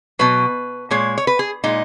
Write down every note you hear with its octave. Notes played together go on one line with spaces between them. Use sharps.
B2 F#3 B4
A#2 G#3 C#5
C#5
B4
G#4
A#2 G#3 D#4